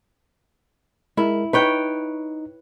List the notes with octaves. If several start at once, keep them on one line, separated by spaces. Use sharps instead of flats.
G#3 E4 A#4
D#4 B4 C#5 G5